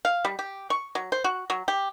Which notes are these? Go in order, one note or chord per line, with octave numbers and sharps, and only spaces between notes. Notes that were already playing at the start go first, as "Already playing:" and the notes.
F5
G3
G4
C#6
F#3
C5
F#4
F#3
G4